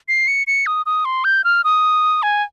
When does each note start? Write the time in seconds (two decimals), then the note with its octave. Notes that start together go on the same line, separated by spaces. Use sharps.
0.08 C7
0.28 C#7
0.47 C#7
0.66 D#6
0.86 D#6
1.05 C6
1.24 G6
1.44 F6
1.64 D#6
2.23 G#5